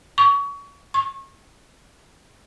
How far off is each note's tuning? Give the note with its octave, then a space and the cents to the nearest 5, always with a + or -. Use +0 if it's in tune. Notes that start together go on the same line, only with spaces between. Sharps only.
C#6 +30
C#6 -35